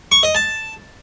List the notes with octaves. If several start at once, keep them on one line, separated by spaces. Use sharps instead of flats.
C#6
D#5
A5